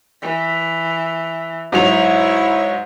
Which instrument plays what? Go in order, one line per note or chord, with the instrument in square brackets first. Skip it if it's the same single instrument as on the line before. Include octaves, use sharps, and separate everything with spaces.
[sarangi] E3
[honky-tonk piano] G#2 F#3 F7 [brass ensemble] E4 [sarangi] C#5